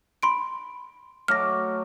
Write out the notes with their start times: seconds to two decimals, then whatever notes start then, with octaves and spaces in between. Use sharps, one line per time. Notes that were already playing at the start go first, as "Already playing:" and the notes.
0.23 B5 C6 D7
1.28 F#3 A3 D6 F6 A#6